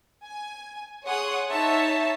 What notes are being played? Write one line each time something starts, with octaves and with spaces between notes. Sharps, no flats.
G#5
G#4 C#5 F#5 C6 D#6
D#4 C#5 E5 A5